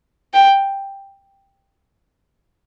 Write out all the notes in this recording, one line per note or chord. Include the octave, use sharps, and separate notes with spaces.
G5